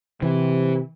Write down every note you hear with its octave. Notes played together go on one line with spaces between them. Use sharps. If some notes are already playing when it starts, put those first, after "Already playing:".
C3 E3